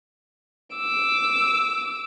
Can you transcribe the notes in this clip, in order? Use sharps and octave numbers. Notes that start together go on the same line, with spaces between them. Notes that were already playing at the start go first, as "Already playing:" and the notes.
D6 E6